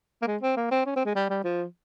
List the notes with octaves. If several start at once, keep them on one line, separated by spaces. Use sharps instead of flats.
A#3
G#3
C4
A#3
C4
C#4
C4
G#3
G3
G3
F3